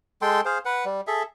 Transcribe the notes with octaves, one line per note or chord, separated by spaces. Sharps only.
G#3 A4 G5 C6
G#4 C5 F5
B4 F#5
G3
G#4 A4 E5